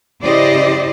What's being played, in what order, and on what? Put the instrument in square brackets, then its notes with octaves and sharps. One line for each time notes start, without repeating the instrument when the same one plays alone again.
[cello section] C#3 E4 G4 C5 D5 D#5